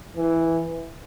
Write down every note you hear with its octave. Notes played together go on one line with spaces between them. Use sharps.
E3